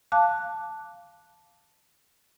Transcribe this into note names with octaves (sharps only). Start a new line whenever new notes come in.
F5 A5 D6 F#6